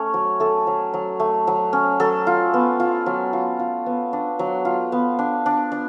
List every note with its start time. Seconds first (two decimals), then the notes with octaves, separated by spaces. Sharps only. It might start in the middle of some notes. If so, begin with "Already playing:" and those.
Already playing: A3 C#4 C#5
0.14 F#3
0.40 A3 A4
0.67 F#3
0.94 F#3
1.20 A3
1.47 F#3
1.73 C#4
2.00 F#3 A4
2.27 F4
2.54 B3
2.80 F4
3.06 F#3
3.33 F4
3.60 F4
3.86 B3
4.13 D4
4.39 F#3
4.65 F4
4.92 B3
5.19 D4
5.46 D4
5.72 D4